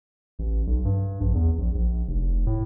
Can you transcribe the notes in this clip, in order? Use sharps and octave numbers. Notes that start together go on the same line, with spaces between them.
A1
B1
G2
A#1
E2
A#1
A#1
F1
A2